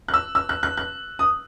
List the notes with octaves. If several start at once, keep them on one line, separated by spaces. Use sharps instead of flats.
F#6
E6
E6
F#6
F#6
F#6
D#6